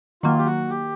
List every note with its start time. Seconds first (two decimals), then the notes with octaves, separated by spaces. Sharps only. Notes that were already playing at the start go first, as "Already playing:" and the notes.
0.23 D#3 F#3 A#3 F4
0.38 G4
0.46 F#4
0.70 G4